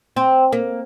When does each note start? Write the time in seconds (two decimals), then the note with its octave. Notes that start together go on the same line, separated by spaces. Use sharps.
0.16 C4
0.52 A#3